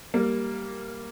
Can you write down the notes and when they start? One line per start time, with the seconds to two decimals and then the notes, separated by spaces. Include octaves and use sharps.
0.14 G3 A#3